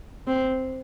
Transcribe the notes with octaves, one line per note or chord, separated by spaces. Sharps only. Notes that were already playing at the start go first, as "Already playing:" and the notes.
C4